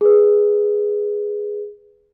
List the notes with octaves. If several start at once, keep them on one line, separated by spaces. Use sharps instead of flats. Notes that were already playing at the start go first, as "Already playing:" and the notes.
G#4 B4